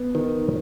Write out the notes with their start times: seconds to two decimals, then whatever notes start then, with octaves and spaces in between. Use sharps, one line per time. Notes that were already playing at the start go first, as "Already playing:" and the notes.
Already playing: B3
0.15 D#3